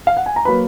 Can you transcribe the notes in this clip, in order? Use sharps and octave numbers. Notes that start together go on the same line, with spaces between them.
F5
F#5
G#5
A#5
F#3 A#3 B4 B5